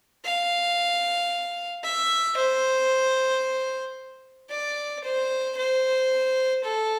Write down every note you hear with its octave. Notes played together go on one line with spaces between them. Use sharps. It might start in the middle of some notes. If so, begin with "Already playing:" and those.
F5
E5
C5
D5
C5
C5
A4